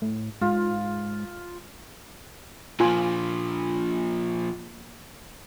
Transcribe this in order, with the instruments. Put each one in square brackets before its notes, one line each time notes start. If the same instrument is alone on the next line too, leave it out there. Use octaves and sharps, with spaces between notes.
[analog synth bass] A2
[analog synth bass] G#2 [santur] F4
[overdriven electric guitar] A#2 F3 [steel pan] F4 G#5